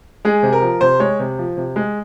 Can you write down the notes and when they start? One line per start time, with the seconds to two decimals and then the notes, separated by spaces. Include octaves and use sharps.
0.25 G#3 G#4
0.43 C3
0.53 A#4
0.62 F3
0.81 C3 C5
1.00 G#3 C#5
1.20 C3
1.38 F3
1.57 C3
1.76 G#3